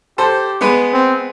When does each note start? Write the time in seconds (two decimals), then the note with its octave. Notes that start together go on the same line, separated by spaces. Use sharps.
0.18 G4 A4 C5
0.61 G#3 B3 B4
0.93 C4